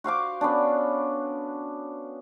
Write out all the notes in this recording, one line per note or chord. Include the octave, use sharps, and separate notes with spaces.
F#4 C5 F5 D6
B3 C#4 D4